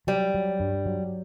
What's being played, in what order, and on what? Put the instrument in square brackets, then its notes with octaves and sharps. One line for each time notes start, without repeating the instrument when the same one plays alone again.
[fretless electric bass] F#3 [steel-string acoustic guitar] G3
[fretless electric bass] F#3
G2
F#3